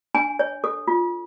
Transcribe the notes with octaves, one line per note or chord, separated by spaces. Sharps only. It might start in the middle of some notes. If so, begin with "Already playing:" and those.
D4 G#5
C#5
A4
F4